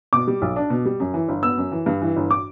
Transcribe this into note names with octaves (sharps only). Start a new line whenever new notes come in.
B2 D6
G3
B1
D4
B2
G3
F#2
E3
G1
B3 E6
F#2
E3
G2
E3
G1
D6